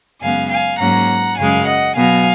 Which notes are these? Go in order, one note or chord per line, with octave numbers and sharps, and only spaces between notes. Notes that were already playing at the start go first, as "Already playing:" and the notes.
F#2 C#3 G#3 B3 F5 G#5
F5 G#5
G#2 F#3 A#3 C#4 F#5 A#5
F#2 C#3 G#3 F5 G#5
D#5 F#5
B2 F#3 B3 F5 G#5